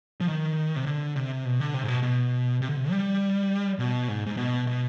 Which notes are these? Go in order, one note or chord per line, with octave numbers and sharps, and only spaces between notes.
F3
D#3
C3
D3
C3
B2
D3
C3
G#2
B2
B2
C3
D3
C3
G3
B2
G#2
G#2
B2
B2